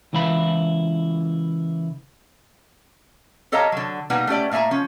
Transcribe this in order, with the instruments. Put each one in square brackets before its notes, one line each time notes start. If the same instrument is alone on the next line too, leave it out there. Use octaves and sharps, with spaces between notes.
[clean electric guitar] C#2 E3 E4 F5 B5
[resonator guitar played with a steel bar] G4 A4 C#5 D#5 F5 A#5
D3 F#3
B2 G3 A#3 D#4 B4 F#5
A3 C#4 G4 D5
A2 A#3 E5 G#5 A#5
F3 C#4